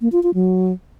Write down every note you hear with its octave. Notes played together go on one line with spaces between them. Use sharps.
A#3
F4
F4
F#3